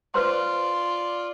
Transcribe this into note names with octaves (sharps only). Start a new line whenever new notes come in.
F4 B4 C5 D5 C6